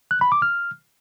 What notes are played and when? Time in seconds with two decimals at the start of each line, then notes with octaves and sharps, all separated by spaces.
0.11 F#6
0.21 B5
0.32 D6
0.42 F6